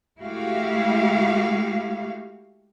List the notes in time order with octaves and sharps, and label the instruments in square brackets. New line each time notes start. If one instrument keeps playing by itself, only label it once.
[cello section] G#3 A3 E4 F#4 G4 F5